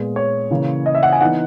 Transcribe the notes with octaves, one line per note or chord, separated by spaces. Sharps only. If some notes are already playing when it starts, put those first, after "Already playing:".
Already playing: A#2 G#3 B3
C#5
C#3 E3 A#3
D#5
E5
F#5
G#5
E3 B3 D#4 F#5